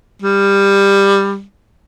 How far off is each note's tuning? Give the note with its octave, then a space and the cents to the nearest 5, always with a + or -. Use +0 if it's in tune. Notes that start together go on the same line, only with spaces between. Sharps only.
G3 +15